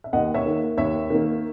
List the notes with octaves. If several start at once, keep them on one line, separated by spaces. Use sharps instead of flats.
E5
D#2 D#5 F#5
C#5 E5
D#3 A#3
D#2 C#5 E5
D#3 A#3